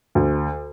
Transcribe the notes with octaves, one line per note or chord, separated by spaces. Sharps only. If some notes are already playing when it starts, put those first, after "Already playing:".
D2